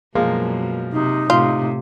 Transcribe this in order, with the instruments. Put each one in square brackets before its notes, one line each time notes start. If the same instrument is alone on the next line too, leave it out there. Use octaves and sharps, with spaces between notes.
[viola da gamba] F#2 B2 [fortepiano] F3 G#3 A#3
[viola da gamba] C3 [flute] D#4
[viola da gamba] A2 C3 [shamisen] F4